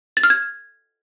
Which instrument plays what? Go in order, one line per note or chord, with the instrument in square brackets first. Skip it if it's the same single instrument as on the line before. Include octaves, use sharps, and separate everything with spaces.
[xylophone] A6
F6
G#6